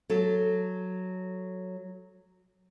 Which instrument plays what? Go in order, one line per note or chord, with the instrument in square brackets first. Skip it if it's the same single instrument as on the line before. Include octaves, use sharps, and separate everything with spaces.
[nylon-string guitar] F#3 A4